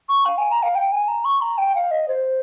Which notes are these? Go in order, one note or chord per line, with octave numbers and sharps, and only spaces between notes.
C#6
F5
G#5
A#5
F5
G5
G#5
A#5
C#6
A#5
G5
F5
D#5
C5